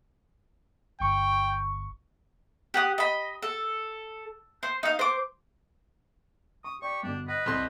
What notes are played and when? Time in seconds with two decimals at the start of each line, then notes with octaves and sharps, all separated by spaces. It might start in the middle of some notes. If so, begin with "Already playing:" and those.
1.00 G1 G5 C#6
2.74 G4 F#5 D#6
2.98 D#5 B5
3.42 A4
4.63 C5
4.83 D#4 F5
4.99 C5 D6
6.64 C#6 D#6
6.82 G4 D5 C#6
7.03 G2 B2 D3 D4
7.28 B4 D#5 F#5 A#6
7.46 C2 C4 A4 D#5 C6 G6